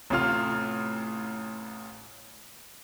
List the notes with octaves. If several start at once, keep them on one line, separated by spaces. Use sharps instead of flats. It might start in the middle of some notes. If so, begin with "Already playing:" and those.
A1 A2 C3 F4 F6